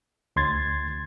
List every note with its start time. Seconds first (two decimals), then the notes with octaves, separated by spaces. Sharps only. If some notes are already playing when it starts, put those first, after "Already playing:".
0.36 D2 C6 G#6 A6